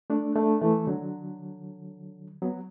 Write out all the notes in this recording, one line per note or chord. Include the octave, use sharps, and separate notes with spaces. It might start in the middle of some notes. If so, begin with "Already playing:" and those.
A3 D4
A3 D4
E3 A3
D3 F#3
F#3 B3